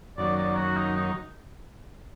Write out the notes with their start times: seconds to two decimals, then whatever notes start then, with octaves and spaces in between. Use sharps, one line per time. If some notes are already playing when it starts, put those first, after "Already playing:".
0.18 F#2 D#3 F#3 A#3 D5
0.37 D5
0.57 F#4
0.77 D#4
0.96 D#4